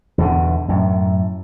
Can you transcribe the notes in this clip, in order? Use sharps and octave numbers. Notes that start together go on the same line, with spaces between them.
E2 B2 D3
F#2 A2